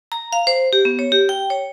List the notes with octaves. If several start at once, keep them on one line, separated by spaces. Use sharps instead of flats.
A#5
F5
C5
G4
B3
C#5
G4
G5
C#5